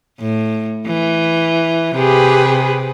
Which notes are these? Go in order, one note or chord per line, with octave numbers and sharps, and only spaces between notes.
A2
E3
C3 G4 G#4 B4